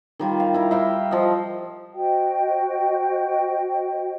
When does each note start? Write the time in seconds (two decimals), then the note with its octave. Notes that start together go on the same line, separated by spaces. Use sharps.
0.19 D#3 G3 F4
0.40 F5
0.54 E4 A#4
0.71 E5 F5 G5 A#5
1.11 F3 D#5
1.94 F#4 C5 D#5 G5